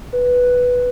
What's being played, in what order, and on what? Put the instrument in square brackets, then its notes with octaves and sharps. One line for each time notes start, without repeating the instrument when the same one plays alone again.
[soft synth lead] B4